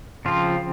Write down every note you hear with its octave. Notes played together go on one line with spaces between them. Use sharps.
C#3 F3 C4 F4